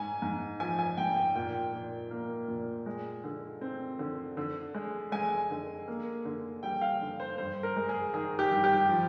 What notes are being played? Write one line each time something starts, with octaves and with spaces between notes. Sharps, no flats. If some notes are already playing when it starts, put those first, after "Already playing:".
Already playing: G#2 G#5
G#2
F3 G#5
G#5
G#2 G5
G5
A#2 G5
A#2
A#3
A#2
G#3
D3
C4
D3
D3
G#3
G#3 G#5
D3
A#3
D3
G3 G5
F5
D3
C5
G2 C5
A#4
G#3
G#4
D#3 G#4
G4
G2
G4
F3